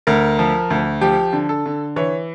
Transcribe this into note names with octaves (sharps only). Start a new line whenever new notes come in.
D2 A#4
F3
D2
F3 G4
D3
A4
D3
E3 C#5